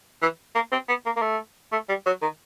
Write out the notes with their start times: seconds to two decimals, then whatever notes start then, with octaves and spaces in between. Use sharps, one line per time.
0.22 E3
0.55 A#3
0.72 C4
0.89 B3
1.06 A#3
1.17 A#3
1.22 A3
1.72 A3
1.89 G3
2.06 F#3
2.22 D#3